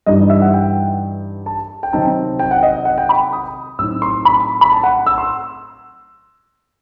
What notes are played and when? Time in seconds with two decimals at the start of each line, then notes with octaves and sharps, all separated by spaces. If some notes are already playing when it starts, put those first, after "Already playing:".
0.06 G2 E3 G3 D#4 D#5
0.30 E5
0.42 F#5
0.54 G5
1.46 A5
1.83 G5
1.93 C3 D#3 F#3 C4 D#4 A5
2.39 G5
2.51 F#5
2.63 D#5
2.85 F#5
2.98 G5
3.09 B5
3.33 D#6
3.79 A2 F#3 C4 D#4 E6
4.02 C6
4.25 B5
4.61 B5
4.72 A5
4.83 F#5
5.07 E6
5.18 C6